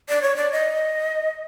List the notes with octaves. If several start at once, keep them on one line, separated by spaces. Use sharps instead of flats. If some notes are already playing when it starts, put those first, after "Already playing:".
D5
C#5
D5
D#5